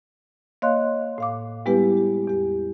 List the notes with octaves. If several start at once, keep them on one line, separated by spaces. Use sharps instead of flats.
A#3 C#5 D#5 F5 C6 F#6
A2 F5 D6
G3 G#3 B3 E4 G4 B4
G4
E2 G4